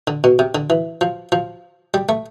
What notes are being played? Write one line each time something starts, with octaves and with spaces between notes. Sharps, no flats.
D3
B2
C3
D3
E3
F3
F3
G3
A3